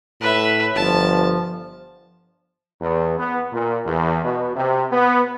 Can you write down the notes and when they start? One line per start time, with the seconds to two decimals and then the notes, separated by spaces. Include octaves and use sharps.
0.21 A2 B4 E5
0.75 G1 F3 A5
2.81 E2
3.17 B3
3.53 A#2
3.86 E2
4.23 B2
4.55 C3
4.91 B3